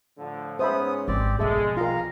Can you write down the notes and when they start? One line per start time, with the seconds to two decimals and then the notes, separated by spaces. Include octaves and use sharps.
0.18 A2 D3 F3
0.59 G#2 B3 C#4 C5 E5 B5 D#6
1.08 G#1 C4 G4 D5
1.39 B1 F3 G#3 G#4 A4 E5
1.77 D#2 G3 F4 A#4 F5 A#5